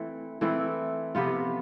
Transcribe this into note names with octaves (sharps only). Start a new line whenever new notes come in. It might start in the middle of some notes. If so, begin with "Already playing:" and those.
Already playing: E3 A3 C4 E4
E3 A3 C4 E4
C3 F3 B3 F4